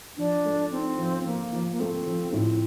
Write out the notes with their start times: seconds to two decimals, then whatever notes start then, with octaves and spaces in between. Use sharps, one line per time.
0.17 F3 D4
0.45 A3
0.71 C4 D#4
0.98 F3
1.25 F3 A#3
1.53 F3
1.72 A#3
1.80 A3 C4
2.06 F3
2.33 A2 C4